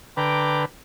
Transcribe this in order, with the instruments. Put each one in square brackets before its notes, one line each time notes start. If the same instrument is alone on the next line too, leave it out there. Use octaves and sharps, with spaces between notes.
[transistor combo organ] D3 B4 [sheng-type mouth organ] G5 A#5 D6